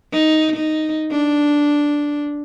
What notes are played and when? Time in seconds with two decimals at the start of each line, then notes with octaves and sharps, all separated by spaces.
0.13 D#4
0.56 D#4
1.12 D4